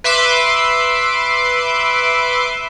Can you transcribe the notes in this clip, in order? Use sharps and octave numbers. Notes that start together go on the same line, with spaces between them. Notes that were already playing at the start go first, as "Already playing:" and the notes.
B4 E5 C6 D6